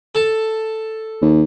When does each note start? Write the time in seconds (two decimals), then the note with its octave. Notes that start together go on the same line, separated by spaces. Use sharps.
0.15 A4 A5
1.22 D#2